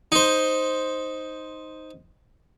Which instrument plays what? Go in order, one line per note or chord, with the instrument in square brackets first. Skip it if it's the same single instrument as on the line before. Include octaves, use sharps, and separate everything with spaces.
[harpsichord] D#4 C5